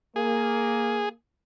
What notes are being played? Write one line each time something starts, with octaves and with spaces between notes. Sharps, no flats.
A#3 G#4